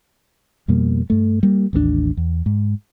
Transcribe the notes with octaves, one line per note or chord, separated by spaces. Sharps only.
F2 B2 G3 A#3
G2 A3
G3 A#3
A1 D#2 A3 D4
E2
G#2